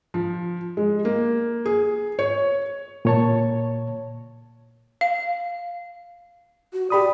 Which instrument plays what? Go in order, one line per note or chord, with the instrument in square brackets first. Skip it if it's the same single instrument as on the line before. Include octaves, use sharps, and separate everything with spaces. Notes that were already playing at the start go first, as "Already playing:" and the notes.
[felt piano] F3
G#3
A#3
G#4
C#5
[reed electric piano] A#2 C#5 A5
[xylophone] F5
[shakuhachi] F#4
[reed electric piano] G4 B5 D#6 [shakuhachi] D5